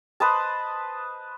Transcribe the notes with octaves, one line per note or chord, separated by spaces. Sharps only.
B4 C5 D#5 A5